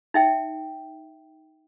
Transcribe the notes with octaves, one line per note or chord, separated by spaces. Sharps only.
D#4 E5 G5